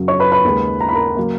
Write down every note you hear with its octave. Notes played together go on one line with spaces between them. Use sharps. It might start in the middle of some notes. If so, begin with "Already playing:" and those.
Already playing: F#2 C#3 F#3
C#5 C#6
B4 B5
B4 B5
D#2 C#3 G#3
A#5
B5
A#4 A#5
C#3 F#3 A#3